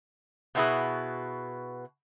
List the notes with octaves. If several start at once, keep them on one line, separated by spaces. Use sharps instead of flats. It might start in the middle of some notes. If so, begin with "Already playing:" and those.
B2 A3 B3 E4 F#4 G#4